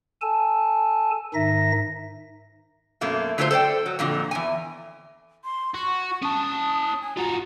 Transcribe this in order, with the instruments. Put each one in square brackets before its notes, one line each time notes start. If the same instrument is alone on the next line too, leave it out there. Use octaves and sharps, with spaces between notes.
[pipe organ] A4 G#5 A5
G#2 D#3 D#4 E5 A#6
[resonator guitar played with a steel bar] F#2 B2 A3 A#3
D3 F#3 A3 F4 A4 C5
A4 C5 D5 G5
F#3
F2 A#2 D3
E2 G#5
[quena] C6
[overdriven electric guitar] F#4 [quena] C#6
[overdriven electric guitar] C#4 A5 [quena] D#6
[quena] G#5
[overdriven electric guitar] F4 F#4 [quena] A#5